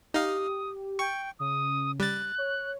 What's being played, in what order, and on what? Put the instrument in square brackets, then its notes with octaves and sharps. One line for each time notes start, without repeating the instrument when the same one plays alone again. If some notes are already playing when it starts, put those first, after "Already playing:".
[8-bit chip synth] D#4 F5 [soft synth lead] G4 [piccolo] D#6
[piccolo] G5 [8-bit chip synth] C#6
[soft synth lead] C#3 [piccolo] D#6
[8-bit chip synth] G3 A6 [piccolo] F#6
[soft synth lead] C#5